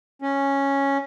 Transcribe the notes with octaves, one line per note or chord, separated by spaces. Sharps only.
C#4